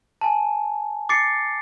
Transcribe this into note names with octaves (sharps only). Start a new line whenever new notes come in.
G#5 A5
D6 A6 C7 C#7